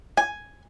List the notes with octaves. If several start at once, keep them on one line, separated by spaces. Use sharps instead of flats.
G#5